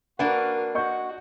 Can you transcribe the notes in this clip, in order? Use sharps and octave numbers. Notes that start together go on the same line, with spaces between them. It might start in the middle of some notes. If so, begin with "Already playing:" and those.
A#3 D4 F#4 A#4 B4 F#5
F#4 D#5 C#6 G6